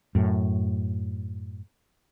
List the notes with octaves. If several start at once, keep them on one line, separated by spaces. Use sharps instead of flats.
F#2 A2